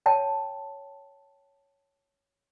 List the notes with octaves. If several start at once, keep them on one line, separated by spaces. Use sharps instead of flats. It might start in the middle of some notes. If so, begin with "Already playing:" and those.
C#5 G5 A5